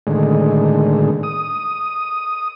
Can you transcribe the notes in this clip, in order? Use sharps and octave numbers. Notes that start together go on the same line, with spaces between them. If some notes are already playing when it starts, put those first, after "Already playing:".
A2 D3 D#3 G#3
D#6